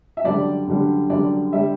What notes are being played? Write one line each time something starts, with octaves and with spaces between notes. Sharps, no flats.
E5
F#2 D3 G3 D5
F#2 D3 G3
F#2 D3 G3 D5
D3 G3 E5